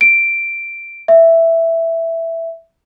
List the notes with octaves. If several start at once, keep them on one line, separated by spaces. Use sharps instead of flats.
D7
E5